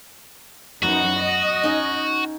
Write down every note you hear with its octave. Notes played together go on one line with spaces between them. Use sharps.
F#2 B3 D#4 F#4
D#5
C#4 D#4